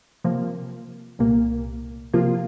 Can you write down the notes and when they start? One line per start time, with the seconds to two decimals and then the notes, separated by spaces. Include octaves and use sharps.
0.24 C3 F3 A#3
1.19 C2 A#2 A#3
2.14 C3 F3 A#3 F4